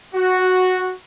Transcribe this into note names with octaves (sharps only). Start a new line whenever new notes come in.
F#4